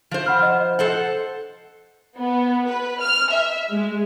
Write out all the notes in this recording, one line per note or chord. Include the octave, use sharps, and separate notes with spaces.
F3 C5
F#5 B5 F6
D#5
A4 C5 F#5
B3
B4
F6
E5
G#3